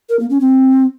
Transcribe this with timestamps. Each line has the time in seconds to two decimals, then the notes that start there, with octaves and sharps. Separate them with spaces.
0.09 A#4
0.20 A#3
0.30 C#4
0.40 C4